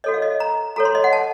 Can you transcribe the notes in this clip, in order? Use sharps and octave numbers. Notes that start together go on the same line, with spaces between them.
F#4 A4 C#5 D#5
F5
D#5
A#5
F#4 A4 C#5 A#5
C6
D#5
F#5
A5